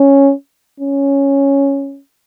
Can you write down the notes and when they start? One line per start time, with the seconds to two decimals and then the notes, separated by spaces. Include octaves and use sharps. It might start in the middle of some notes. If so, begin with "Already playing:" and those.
Already playing: C#4
0.80 C#4